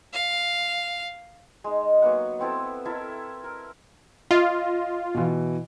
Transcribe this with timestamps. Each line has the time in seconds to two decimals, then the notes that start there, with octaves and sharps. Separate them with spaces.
0.13 F5
1.64 G#3 D#4
2.02 F#3 A#3 B3 F#5
2.39 B3 C4 E4 A4
2.85 E4 A4 A#4 E5
3.44 A#4
4.31 F4 D#5
5.14 B2 E3